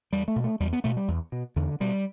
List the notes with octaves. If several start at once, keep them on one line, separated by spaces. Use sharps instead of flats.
E2 G3
A3
B2
A3
E2 G3
B3
B2 A3
G3
E2
B2
E2 D3
B2 G3